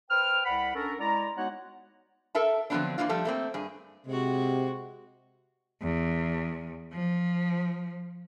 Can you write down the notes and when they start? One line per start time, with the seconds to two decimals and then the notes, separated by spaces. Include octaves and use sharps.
0.11 B4 C5 G5 F6
0.45 C2 D5 F#5 B5
0.75 C#4 D4 A4 A#4
1.00 G#3 E4 D5 A#5
1.38 G#3 B3 D#4 F#4 C#5 F#5
2.35 A4 A#4 E5 A5
2.70 D3 F3 F#3 B3 C4 D4
2.98 E3 G3 A#3 D4 F4
3.09 F3 G3 A3 A4
3.25 A3 A#3 C4
3.54 G2 G#4
4.06 C3 G#3 F#4
5.82 E2
6.93 F3